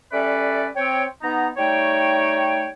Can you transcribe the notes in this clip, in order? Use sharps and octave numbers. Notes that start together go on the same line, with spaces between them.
G3 C#4 A4 B4 D5 E5
C4 C#5 G5
B3 D#4 A#5
G3 A3 D#4 C#5 G5